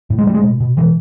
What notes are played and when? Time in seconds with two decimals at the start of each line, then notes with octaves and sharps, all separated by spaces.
0.10 A2
0.18 G#3
0.27 A2 G3
0.35 G#3
0.43 B2
0.60 B2
0.77 B2 E3